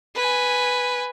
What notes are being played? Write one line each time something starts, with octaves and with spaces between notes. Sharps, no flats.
B4 G#5